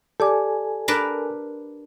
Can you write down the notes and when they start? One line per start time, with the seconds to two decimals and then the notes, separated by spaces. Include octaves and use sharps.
0.20 G4 A4 D5 G#5 D6
0.88 D4 A#4 B4